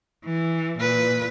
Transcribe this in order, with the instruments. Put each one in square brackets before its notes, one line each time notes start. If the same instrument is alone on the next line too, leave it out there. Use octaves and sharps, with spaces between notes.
[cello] E3
A#2 B4